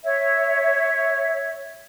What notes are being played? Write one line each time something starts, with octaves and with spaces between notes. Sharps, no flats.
C#5 E5